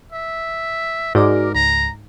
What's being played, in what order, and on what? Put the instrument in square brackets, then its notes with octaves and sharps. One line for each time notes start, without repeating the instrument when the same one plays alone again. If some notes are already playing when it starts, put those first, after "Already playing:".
[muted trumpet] E5
[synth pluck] G#2 [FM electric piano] F#4 D5 D6 [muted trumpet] A#4
[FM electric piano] C#2 [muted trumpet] A#5